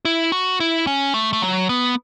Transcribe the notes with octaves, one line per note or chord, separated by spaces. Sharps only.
E4
F#4
E4
C#4
A3
A3
F#3
B3